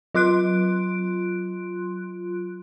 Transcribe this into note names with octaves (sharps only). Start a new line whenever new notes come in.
F#3 F4 C6 F#6 D7